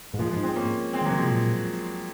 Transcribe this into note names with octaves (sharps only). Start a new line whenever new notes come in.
G#2
A#2 F3 G#3
F3 G#3
G#2
G#3 C4
A#3 C#4
G#3 C4
D#3 F#3 A#3
C#3
C3 F3 G#3
A#2